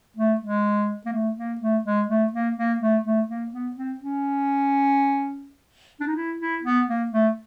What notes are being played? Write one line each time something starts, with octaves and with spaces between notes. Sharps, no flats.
A3
G#3
A#3
A3
A#3
A3
G#3
A3
A#3
A#3
A3
A3
A#3
B3
C4
C#4
D4
D#4
E4
E4
B3
A#3
A3